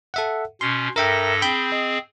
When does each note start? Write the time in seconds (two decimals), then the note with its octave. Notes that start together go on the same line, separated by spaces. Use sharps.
0.14 A4 E5 F#5
0.61 B2 C#4 C6
0.96 G2 A4 A#4 E5 G5 A#6
1.42 C4 G#4 G5 B5 G6
1.72 D#5